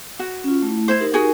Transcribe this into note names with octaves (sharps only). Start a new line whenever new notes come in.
F#4
C#4 F4
A3 E4
E4 C5
D#4 G4 A#4
F#4 G#4